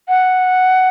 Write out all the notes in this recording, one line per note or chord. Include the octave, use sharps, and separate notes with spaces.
F#5